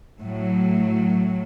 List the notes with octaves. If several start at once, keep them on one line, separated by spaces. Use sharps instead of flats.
A2 F#3